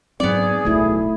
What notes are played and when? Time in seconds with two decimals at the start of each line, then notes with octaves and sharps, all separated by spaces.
0.20 G#2 F#3 B3 C4 G#4 D5
0.65 D1 B1 A3 E4